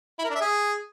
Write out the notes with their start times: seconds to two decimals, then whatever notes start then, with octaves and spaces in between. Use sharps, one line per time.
0.19 E4
0.24 A#4
0.30 D4
0.35 E5
0.41 G#4